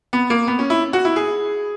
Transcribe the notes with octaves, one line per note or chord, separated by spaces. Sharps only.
B3
A#3
B3
C#4
E4
F#4
E4
G#4